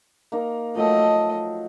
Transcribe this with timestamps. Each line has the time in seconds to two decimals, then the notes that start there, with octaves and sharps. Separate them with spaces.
0.32 A#3 D#4
0.75 F3 F#3 A3 A4 D#5